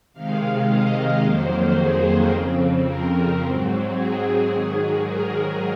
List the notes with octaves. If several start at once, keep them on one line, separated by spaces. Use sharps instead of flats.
C3 D#3 G#3 F5
D#5
F2 D#3 F#3 A#3 C5
G#4
F2 C#3 F3 C4
A#4
G#2 F#3 C4
G#4
G#2 D#3 F#3 G#4
A#4